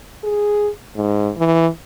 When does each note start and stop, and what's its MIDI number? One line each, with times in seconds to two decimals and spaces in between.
0.24 0.69 68
0.96 1.30 44
1.37 1.67 52